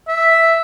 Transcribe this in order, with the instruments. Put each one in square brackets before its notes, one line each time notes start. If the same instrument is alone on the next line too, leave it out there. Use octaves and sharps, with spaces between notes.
[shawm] E5